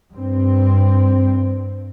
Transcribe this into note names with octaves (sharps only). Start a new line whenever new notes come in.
G2 C4